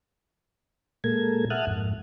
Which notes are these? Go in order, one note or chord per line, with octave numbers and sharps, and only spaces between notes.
A#2 G#3 A#3 A4 A#4 G#6
E5 F#5 A5 D#6 F6 F#6
F2 G#2